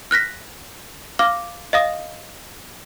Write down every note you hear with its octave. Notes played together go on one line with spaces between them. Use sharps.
F6 F#6 A#6 B6
F5 D6 F6
D#5 F5 D#6